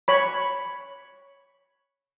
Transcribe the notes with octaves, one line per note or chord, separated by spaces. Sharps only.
C#5 B5